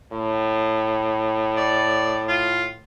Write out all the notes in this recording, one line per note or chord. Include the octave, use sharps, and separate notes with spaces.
A2
D5
F4